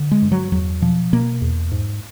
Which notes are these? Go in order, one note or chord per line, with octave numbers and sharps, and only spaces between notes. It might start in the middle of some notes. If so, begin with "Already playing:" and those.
Already playing: D3
G#3
G2
F#3
E2 F#3
B2 F3
B2 A#3
E2
G#2